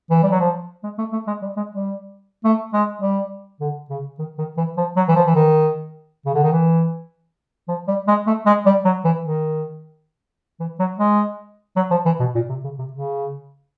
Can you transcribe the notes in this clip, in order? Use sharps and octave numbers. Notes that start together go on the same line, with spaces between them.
E3
G3
F#3
F3
G#3
A3
A3
G#3
G3
G#3
G3
A3
G#3
G3
D3
C#3
D#3
D#3
E3
F3
F#3
E3
F3
E3
D#3
C#3
D3
D#3
E3
F3
G3
G#3
A3
G#3
G3
F#3
E3
D#3
E3
F#3
G#3
F#3
F3
E3
B2
A#2
C3
C#3
C3
C#3